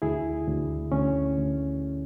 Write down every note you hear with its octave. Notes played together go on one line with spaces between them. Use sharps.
D2 E4 G#4
D2
D2 C#4
D2